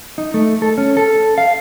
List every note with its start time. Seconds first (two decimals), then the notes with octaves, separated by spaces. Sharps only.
0.18 D#4
0.34 A3
0.62 A4
0.78 C#4
0.97 A4
1.38 F5